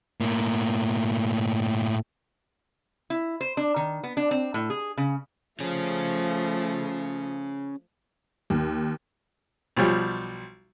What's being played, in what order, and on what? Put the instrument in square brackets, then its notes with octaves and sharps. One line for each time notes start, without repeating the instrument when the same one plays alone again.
[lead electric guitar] A2 A#3
[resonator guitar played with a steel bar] E4
C5
D4
D#3
B3
D4
C4
A2
G#4
C#3
[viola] F3 A3 [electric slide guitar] C#4 G#4
[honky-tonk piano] D#2
[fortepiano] B1 F3 G3